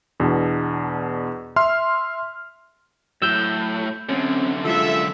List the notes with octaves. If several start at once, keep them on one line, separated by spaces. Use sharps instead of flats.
E2 B2 D4
E5 C6 F6
A2 F#3 E6 G6
F#2 D3 C4 C#4
F3 G#3 F4 A4 E5